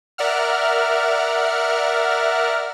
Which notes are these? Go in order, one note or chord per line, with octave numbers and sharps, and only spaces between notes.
A#4 D5 E5 F#5 F6